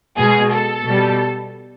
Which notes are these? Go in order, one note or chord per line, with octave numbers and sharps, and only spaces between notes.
B2 G#3 G#4
A4
B2 G3